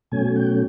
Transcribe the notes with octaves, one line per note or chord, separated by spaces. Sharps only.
B2 F#3 A3 C#4 G#5
G5